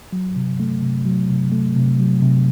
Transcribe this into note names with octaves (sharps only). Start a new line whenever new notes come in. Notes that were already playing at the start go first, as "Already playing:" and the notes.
F#3
C3
A3
C3
F#3
C3
A3
C3
F#3
C3